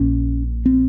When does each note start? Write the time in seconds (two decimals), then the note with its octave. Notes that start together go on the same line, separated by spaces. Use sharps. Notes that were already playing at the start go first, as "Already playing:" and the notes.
Already playing: A#1 A#2 C#4
0.66 C4